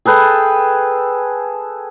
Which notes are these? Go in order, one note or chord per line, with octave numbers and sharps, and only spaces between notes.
G#4 A4 B4 G5